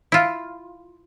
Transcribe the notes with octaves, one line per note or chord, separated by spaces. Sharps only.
E4 F4